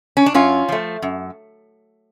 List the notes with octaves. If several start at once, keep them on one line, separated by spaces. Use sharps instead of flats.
C#4
D4
F#2 C#4 F4
F3 A3
F#2